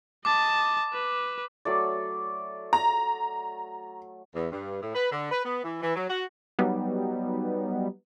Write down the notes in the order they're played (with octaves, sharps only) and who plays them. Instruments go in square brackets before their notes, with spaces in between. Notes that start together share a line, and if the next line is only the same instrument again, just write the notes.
[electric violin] D#5 A5 [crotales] D6
[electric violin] B4
[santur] F#3 A3 D5
[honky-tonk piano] A#5
[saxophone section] E2
G2
A2
B4
D3
B4
B3
E3
E3
F#3
F#4
[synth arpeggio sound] F#3 G3 B3 D#4